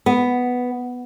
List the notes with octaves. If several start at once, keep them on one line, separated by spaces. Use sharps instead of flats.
B3